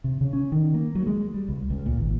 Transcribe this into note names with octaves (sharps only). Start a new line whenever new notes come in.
C3
C#3
C#4
D#3
A#3
F#3
G#3
G3
C#2
C#2
A#2
G#1